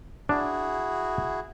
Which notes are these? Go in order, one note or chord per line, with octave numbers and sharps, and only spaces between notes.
D4 E4 F#4 G#4